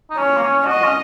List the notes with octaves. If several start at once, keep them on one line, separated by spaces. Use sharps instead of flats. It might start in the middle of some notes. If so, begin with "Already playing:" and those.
D#4
C#4 C#5
A#3
C#4
F#4 D#5
C#4